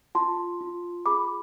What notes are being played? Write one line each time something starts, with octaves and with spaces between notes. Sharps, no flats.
F4 A5 C6
F4
G#4 B5 D6